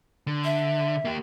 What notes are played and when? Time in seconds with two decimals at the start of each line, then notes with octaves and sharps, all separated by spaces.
0.27 D3
0.44 E5
1.05 A#3 G4